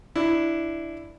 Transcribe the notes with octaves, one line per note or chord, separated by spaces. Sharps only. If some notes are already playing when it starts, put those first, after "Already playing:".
D4 E4